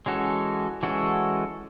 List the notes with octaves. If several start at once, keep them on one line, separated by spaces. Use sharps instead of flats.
E3 G#3 C#4 F#4 A4
E3 G#3 C#4 F#4 A4